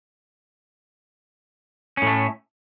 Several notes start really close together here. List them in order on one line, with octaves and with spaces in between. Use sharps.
C#4 A2 A3